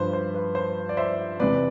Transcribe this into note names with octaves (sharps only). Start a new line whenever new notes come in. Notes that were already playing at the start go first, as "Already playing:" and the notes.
Already playing: G2 F3 B4 C5
C5
B4
C5
D5
C5 E5
E2 C3 E3 B4 D5